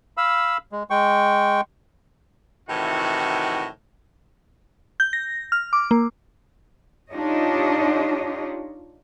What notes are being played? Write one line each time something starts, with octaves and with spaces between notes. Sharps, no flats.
F5 B5 E6
G#3
G#3 G5 C#6
A2 C3 D#3 E3 F#4
G6
A#6
F6
D6
A#3
D4 D#4 F4 G4 C#5 D#5